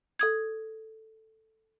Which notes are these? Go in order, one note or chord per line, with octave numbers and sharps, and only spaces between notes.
A4 D#6 G#6